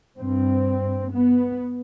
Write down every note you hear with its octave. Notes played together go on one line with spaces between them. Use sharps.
G2 C4
B3